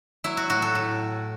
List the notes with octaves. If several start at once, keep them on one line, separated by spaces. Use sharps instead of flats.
F#3 E4
F#4
A2 F#4
A4
A2